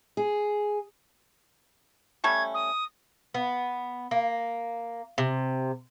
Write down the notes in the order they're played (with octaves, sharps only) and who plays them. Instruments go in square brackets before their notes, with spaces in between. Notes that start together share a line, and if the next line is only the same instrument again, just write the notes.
[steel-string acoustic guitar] G#4
[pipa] G3 A3 C#4 [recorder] G#6
[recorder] D#6
[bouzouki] B3
A#3
C3